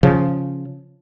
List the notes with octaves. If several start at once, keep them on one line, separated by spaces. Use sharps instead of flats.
C#3 F3